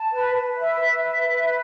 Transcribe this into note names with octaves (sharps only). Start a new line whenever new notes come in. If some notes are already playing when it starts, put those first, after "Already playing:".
Already playing: A5
B4
B4
E5
B4
E5
B4